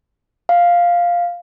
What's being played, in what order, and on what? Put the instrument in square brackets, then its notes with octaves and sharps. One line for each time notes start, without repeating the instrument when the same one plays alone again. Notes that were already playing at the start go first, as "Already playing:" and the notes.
[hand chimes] F5